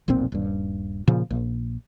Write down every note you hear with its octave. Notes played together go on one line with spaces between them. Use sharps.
F1 B1 A#2 C4
D#1 G2
A#2 C#3 F3
A#1